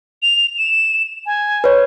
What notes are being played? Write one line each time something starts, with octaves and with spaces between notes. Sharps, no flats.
F7
E7
G#5
B4 C#5